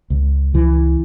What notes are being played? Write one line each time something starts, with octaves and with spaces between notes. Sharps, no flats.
C#2
C#2 E3